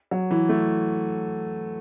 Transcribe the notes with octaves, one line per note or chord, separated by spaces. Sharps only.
F#3
E3
A3